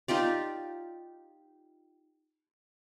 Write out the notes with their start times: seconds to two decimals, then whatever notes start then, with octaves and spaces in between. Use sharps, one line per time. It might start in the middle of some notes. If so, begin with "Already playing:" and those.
0.08 D#4 F4 G4 D5